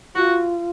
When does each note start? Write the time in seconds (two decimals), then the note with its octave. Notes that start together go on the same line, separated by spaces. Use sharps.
0.15 F4 F#4